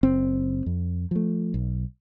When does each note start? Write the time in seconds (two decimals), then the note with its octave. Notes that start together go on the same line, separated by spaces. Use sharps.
0.03 F#1 C4
0.66 F2
1.11 F3 A3
1.54 B1